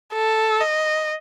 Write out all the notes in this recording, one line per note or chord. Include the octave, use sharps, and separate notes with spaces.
A4
D#5